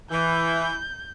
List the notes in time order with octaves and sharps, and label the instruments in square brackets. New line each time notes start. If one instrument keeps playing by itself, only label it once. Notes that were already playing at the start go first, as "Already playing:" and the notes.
[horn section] E3 [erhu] G6